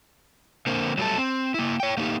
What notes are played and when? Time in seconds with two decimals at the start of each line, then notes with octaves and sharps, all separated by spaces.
0.67 D3 A#3 C4
0.98 F#3 G3 A3 D4 A4
1.18 C4
1.54 A#3 E4
1.80 C#5 G5
1.97 A3 A#3 D#4 G4